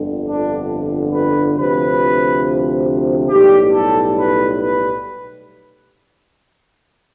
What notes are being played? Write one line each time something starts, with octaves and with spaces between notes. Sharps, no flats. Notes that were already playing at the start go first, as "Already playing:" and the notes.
Already playing: G1 F2 D3
D4
B4
D2 C3 F3 B4
B1 A2 G3 G4
A4
B4
B4